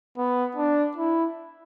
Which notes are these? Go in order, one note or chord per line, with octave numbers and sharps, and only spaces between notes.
B3
D4
E4